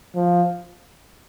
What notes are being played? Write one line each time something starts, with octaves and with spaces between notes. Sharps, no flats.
F3